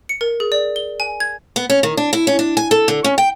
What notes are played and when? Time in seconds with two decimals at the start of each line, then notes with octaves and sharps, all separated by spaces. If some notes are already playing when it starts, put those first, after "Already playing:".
0.09 C#7
0.21 A#4
0.40 G#4
0.52 D5
0.76 G7
1.00 G#5
1.20 G#6
1.56 B3
1.70 C#4
1.83 D#3
1.97 D4
2.13 E4
2.27 C#4
2.39 D4
2.57 G#5
2.71 A4
2.88 D3
3.04 C#4
3.18 G5